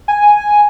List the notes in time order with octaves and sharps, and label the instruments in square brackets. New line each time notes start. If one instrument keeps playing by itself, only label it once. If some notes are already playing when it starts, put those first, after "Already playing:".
[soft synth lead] G#5